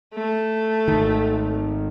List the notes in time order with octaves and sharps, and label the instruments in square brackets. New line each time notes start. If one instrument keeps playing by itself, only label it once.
[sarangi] A3
[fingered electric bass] G#1 D#3